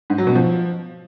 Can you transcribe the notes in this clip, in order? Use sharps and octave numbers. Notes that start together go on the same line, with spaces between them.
G#2
F#3
B2
F3